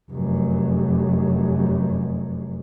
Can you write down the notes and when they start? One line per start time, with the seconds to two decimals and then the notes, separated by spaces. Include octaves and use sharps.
0.10 F1 F#2